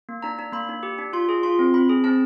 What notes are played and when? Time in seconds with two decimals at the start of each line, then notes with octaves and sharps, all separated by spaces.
0.09 A#3
0.22 D4 A#5
0.39 D4
0.53 A#3 B5
0.69 D4
0.83 G4
0.98 D4
1.13 F4 C6
1.29 G#4
1.43 F4 C6
1.59 C4
1.74 C4 B5
1.89 G#4
2.04 C4 A5